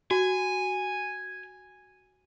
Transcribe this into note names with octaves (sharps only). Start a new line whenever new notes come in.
F#4 G#5